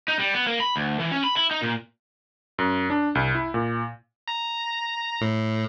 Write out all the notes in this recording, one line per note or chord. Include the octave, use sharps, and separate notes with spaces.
D#4
G3
B3
A#3
B5
D2
E3
C#4
B5
E4
D#4
A#2
F#2
D4
C2
E4
A#2
A#5
A2